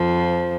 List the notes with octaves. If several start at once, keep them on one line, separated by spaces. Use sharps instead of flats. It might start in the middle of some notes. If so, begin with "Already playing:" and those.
Already playing: F2 F3